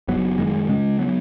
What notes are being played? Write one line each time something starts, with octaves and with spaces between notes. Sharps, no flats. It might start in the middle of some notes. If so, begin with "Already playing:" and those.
F#1 F#3 B3
F#2 D#3 G#3
C#3 G#3 C#4
F#3 B3